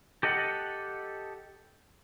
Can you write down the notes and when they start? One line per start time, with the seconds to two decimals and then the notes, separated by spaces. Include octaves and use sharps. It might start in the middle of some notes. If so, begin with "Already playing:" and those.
0.23 G4 A4 D#5 F#5